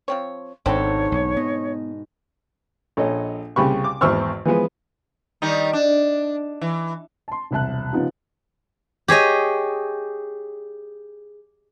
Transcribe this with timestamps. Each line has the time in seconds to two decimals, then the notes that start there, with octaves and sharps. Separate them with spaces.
0.08 F3 C4 C#5
0.66 G#1 G#2 B2 D3 C4 F#4 A4 C#5
1.12 B1
1.37 B3 D#5
2.97 A#1 A4 C#5 D#5
3.56 C2 C#3 G4 B5 C#6
3.84 D6
4.01 G#1 E2 C5 C#6 E6 F6
4.45 E3 F3 G#3 B3
5.42 D#3 G3 D#4
5.73 D4
6.61 E3
7.28 A5 C6
7.51 E1 C2 E5 A5 F#6
7.92 C#3 F3 B3 D#4 F4 G4
9.08 G4 G#4 C#5 D#5